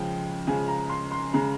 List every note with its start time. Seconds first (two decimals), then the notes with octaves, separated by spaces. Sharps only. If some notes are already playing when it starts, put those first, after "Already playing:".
Already playing: C#3 F3 G#3 G5
0.47 C#3 F3 G#3 G#5
0.68 A#5
0.90 C6
1.11 C6
1.33 C#3 G#3 A#5